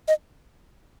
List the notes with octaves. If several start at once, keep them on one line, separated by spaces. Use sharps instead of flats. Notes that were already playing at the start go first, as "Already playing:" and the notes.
D#5